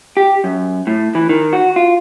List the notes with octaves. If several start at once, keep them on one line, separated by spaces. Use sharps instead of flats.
G4
F#2
A2
E3
D#3
F#4
F4